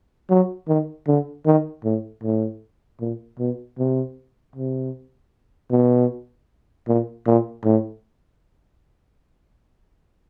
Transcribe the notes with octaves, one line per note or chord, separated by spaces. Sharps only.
F#3
D#3
D3
D#3
A2
A2
A#2
B2
C3
C3
B2
A#2
A#2
A2